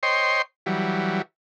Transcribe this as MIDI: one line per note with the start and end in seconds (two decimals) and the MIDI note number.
0.03 0.42 72
0.03 0.42 73
0.03 0.42 75
0.03 0.42 79
0.03 0.42 84
0.66 1.22 52
0.66 1.22 54
0.66 1.22 55